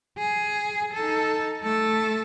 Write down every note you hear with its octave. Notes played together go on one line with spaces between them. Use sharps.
G#4
D#4 A4
A3 A4